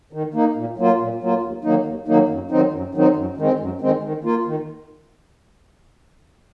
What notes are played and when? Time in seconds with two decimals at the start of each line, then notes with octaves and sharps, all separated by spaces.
0.13 D#3
0.34 A#3 D#4
0.56 A#2
0.78 F#3 A#3 F4
0.99 A#2
1.21 F#3 A#3 F4
1.42 D#2
1.64 D#3 F#3 A#3 D#4
1.85 D#2
2.08 D#3 F#3 A#3 D#4
2.29 F#2
2.51 D#3 F#3 C4 D#4
2.73 F#2
2.95 D#3 F#3 C4 D#4
3.16 F#2
3.37 D#3 G#3 C4
3.60 F#2
3.81 D#3 G#3 C4
4.03 D#3
4.24 A#3 F4
4.46 D#3